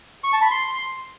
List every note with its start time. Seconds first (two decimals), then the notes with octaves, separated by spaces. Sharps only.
0.24 C#6
0.33 A5
0.42 B5
0.51 C6